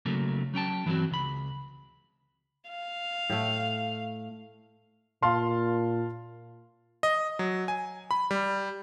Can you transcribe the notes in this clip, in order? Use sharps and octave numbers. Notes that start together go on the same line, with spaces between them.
C#3 F#3 A3 A#3
F#3 C#4 G5 A5
G2 E3 F#3 A#3 C4 F#4
C#2 B5
F5
A2 A3
A#2 F5 A5 C6
D#5
F#3
G#5
B5
G3